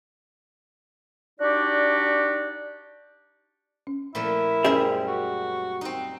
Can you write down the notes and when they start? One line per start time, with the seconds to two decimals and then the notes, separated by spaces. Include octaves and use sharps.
1.40 D4 D#4 F#4 G4 D5
3.87 C#4
4.15 A#2 F3 A3 E4
4.64 F#2 G3 C#4 G#4 C5 E5
5.08 F#4
5.81 C4 D#4